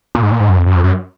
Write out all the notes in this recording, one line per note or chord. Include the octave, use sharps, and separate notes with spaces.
A#2
G#2
A#2
G#2
F#2
F2
F#2
F2
F#2